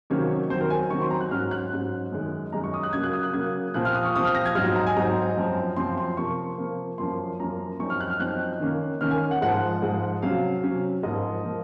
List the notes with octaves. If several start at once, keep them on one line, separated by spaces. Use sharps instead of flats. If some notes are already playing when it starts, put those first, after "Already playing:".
C3 D#3 F#3 A#3 C#4 C#5
D#3 F#3 C4 C5
A#4
G#5
D#3 F#3 C4 C#6
C6
A#5
F#6
G#2 F#3 C#4 F6
F#6
G#2 F#3 C#4
F#2 D#3 G#3 D#4
F#2 D#3 G#3 D#4 A#5
C#6
D#6
F#6
C#3 F#3 A#3 G#6
F#6
D#6
F#6
C#3 F#3 A#3 G#6
A#2 F3 C4 F#6
F6
D#6
C#6
A#2 F3 C4 D#6
F6
A#6
G#6
G#2 F#3 C4 D#4 F6
F6
A#5
G#5
G#2 F#3 C4 D#4 A#5
F#2 F3 C4
F#2 F3 C4 C6
C6
C3 F3 A#3 C#6
C3 F3 A#3
F#2 F3 A#3 C#4 C6
F#2 F3 A#3 C#4 A#5
F#2 F3 C4 D#4 C#6
F6
F#6
F6
F#2 F3 C4 D#4 F#6
D#3 A#3 C#4
D#3 A#3 C#4 F6
G#5
F#5
G#2 F3 G#3 F#5
G#2 F3 G#3
C3 F#3 C#4 F5
C3 F#3 C#4
G#2 F3 A#3 D#5
F3 A#3